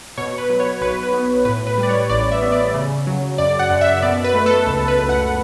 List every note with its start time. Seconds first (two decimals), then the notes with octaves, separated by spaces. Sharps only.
0.18 B2 C#5
0.38 B4
0.50 F#3
0.60 C#5
0.81 B1 B4
1.03 B4
1.14 B3
1.45 A2 B4
1.67 B4
1.78 G3
1.83 D5
1.89 C#5
2.10 A1 D5
2.32 E5
2.42 B3
2.52 D5
2.74 C#3
3.07 F#3
3.38 F#2 D5
3.59 F#5
3.70 F#2
3.81 E5
4.02 B2 D5
4.24 B4
4.34 A3
4.46 A4
4.66 C#2 A4
4.88 B4
4.99 C#2
5.09 F#5